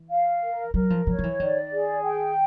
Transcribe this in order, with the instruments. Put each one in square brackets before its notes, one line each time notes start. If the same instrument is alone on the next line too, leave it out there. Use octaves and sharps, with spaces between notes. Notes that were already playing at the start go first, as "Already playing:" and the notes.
Already playing: [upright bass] E3
[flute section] F5
A#4
[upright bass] F#3 [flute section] A#4
[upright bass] F3
[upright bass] F3 [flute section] C#5
[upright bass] F3
E3
[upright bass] D#3 [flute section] D5
[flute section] G#4
G5